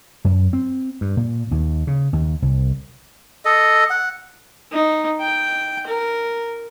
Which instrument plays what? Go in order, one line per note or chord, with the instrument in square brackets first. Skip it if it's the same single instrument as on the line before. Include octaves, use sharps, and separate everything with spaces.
[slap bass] F#2
C4
G2
A#2
D#2
C#3
D#2
C2
[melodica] A4 D#5
F#5
[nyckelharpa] D#4
G5
A#4